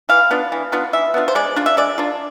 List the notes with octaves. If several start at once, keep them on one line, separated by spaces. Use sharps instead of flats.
E3 F5
B3 D4 F4
E3
B3 D4 F4
E3 E5
B3 D4 F4
C5
G#3 D5
D4 F4
E5
G#3 D5
D4 F4